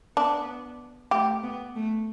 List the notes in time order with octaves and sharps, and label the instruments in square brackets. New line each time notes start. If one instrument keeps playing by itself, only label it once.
[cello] B3 [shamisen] D4
[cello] A3 [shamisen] G4
[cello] B3
A3